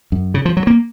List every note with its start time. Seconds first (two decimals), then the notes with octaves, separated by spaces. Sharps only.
0.12 F#2
0.34 C#3
0.45 F3
0.57 F#3
0.67 A#3